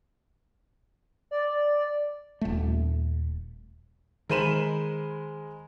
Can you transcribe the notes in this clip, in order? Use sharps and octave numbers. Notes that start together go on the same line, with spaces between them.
D5
D#1 A3
D#3 G#3 A#4 C5 B5 D#7 E7